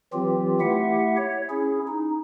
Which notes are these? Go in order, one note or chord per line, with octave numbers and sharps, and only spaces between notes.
E3 F#3 C4 F4 G4
A3 E4 G4 E5 F#5
C#5
C#4 E4 G#4
D#4